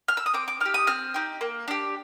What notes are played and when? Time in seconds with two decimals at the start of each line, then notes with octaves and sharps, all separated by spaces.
0.08 F6
0.17 E6
0.26 D#6
0.34 C4 D6
0.48 D6
0.60 D#4 G4 F6
0.74 D#6
0.87 C4 F6
1.14 D#4 G4
1.41 A#3
1.68 D4 G4